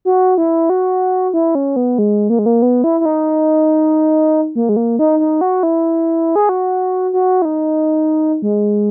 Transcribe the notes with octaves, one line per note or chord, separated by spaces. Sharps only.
F#4
E4
F#4
E4
C#4
B3
G#3
A#3
G#3
A#3
B3
E4
E4
D#4
A#3
G#3
A#3
D#4
D#4
F#4
E4
G#4
F#4
F#4
E4
D#4
G#3